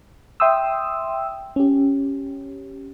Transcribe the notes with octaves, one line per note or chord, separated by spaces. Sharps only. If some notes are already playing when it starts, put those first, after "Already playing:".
E5 G5 C6 D#6 E6
C#4 G4